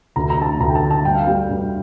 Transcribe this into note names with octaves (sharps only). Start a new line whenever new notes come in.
D2 A#5
A#5
A3 A5
A#5
D2 A#5
G5
A5
D3
A5
G2 G5
F5
G3 G5
G2